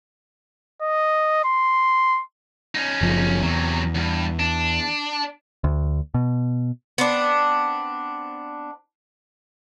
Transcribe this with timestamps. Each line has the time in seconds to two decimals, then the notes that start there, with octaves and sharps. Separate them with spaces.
0.82 D#5
1.45 C6
2.75 C#4 D#4
3.01 F#1 F3
3.43 E2 C3 F#3
3.95 D2 G2
4.39 D4
5.64 D2
6.14 B2
6.98 B3 C4 D4